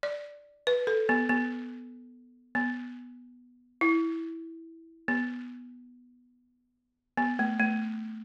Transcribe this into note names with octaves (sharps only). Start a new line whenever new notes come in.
D5
B4
A4
B3
B3
B3
E4
B3
B3
A3
A3